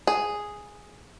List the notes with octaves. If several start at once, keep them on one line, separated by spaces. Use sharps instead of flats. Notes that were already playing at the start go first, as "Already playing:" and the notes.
G#4